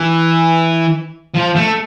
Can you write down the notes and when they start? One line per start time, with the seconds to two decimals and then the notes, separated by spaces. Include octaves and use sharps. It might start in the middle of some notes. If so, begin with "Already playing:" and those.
Already playing: E3
1.34 F3
1.55 A3